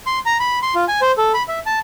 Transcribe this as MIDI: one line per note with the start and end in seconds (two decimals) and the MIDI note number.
0.06 0.19 84
0.26 0.37 82
0.40 0.59 83
0.62 0.74 84
0.75 0.85 65
0.88 1.00 80
1.02 1.12 72
1.18 1.32 69
1.34 1.43 83
1.48 1.59 76
1.66 1.79 81